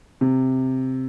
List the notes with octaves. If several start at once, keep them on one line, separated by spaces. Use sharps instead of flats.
C3